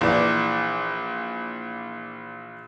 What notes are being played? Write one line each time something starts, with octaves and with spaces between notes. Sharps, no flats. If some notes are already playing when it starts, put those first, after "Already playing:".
A#1 E3 D5